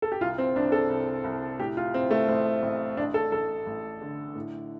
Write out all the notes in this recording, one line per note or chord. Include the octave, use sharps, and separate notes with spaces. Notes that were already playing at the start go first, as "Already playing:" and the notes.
A4
G4
C2 F4
C4
C2 D4
A4
C2
C2
A2 G4
F4
A2 C4
A3
A1 C4
A1
A1 D4
A4
A1 A4
A1
D3
A2